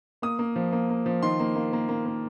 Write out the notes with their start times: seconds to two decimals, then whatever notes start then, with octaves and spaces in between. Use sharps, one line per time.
0.22 A#3 D#6
0.39 A#3
0.56 F3
0.72 A#3
0.90 A#3
1.06 F3
1.22 D#3 C6
1.40 A#3
1.56 A#3
1.73 A#3
1.89 A#3
2.06 A#3